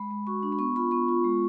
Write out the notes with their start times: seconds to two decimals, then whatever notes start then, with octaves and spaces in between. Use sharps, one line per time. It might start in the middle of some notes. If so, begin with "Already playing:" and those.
Already playing: G#3 B5
0.11 G#3
0.27 F#4 C#6
0.43 D4
0.52 B5
0.59 B3 C#6
0.76 F4 B5
0.91 B3 C#6
1.09 F4
1.24 G#3